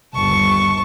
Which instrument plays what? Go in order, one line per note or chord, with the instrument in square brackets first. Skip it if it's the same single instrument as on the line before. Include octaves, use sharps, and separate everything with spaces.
[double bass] G1 D#2 [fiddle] A5 C#6